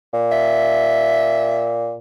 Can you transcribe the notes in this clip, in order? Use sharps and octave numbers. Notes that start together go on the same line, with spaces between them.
A#2
E5